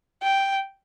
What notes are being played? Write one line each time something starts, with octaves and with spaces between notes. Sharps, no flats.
G5